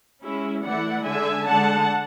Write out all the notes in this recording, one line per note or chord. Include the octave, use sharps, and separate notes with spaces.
G#3 C#4 E4
E3 A3 E4 D5 F#5
D3 G#3 D4 E5 G#5
D3 G#3 D4 F#5 A5